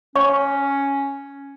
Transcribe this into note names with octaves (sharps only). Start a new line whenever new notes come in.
C#4 C#5 C#6